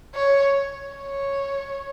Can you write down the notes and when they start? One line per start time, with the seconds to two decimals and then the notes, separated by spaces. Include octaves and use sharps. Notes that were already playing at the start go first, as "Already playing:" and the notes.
0.15 C#5
0.97 C#5